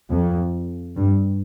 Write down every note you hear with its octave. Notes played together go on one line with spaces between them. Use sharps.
F2
G2